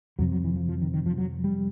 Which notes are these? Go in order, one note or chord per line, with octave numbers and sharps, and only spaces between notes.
F2 C3 F#3
F#3
E3
F3
F3
D#3
D#3
F3
F#3
G3